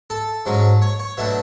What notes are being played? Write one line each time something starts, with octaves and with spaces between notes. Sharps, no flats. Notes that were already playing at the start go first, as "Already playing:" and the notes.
A4
G#2 F#3 C#4
C#5
C#5
B2 F#3 A3 D4 E5